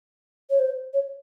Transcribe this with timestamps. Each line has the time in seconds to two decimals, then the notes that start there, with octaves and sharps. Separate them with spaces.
0.50 C#5
0.59 C5
0.93 C#5